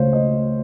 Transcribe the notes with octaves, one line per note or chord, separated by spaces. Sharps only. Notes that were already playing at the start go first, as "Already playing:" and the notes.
Already playing: C#2 C#3 A3 C5 C#5 F5
D#5